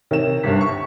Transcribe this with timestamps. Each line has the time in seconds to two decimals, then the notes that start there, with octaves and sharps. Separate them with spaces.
0.11 C3 D#4 A#4 C#5 E7
0.43 G1 C2 G2 B6
0.61 C#6